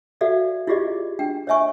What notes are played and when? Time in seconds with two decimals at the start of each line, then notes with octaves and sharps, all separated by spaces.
0.21 F#4 A4 D5 E5 F5
0.67 E4 F4 G4 G#4 D5 D#5
1.19 D4 G5
1.47 C#5 D#5 E5 G#5 C#6